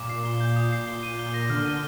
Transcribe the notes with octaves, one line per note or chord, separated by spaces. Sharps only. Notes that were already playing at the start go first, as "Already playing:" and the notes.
Already playing: A#2 D6
C7
G7
G6
D#6
C7
G7
D#7
G7
A#6
D3 F6
D#7